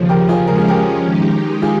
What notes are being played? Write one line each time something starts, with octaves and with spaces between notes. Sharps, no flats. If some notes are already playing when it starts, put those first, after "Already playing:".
Already playing: D#2 C#3 F3
G4 A#4
F4 G#4
F3 G#3 C#4 A#4
G#4
G4 A#4
D#3 G#3 D#4 G4
F4 G#4